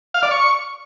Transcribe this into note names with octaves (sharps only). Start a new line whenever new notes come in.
F5
D5
C#6